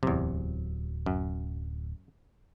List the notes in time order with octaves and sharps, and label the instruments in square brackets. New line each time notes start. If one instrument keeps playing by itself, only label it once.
[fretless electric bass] D1 F#3 [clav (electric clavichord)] E2 C3
[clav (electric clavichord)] F#2